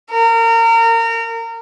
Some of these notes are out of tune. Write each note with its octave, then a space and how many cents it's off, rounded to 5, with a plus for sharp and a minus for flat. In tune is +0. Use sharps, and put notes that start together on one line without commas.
A#4 -30